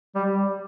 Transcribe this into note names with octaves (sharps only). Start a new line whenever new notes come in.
G3